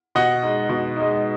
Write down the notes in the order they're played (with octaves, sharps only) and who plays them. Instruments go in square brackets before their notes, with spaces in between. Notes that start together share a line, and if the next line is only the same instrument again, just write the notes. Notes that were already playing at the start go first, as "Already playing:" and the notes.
[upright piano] B2 [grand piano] D#5 F#5
[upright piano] G#3 D#4
B2
G#3 D#4